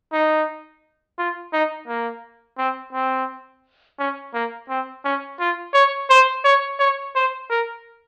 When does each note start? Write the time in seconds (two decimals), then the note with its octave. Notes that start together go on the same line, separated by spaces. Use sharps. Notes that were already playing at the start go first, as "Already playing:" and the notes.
0.13 D#4
1.19 F4
1.53 D#4
1.88 A#3
2.58 C4
2.93 C4
3.99 C#4
4.34 A#3
4.69 C4
5.05 C#4
5.40 F4
5.74 C#5
6.10 C5
6.45 C#5
6.80 C#5
7.16 C5
7.50 A#4